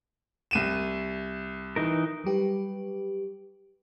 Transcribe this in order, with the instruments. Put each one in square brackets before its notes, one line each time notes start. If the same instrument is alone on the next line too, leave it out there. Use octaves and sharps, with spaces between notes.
[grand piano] C2 D#7 E7
[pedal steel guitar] E3 D#4 A#4
[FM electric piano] F#3 G3 G4 B4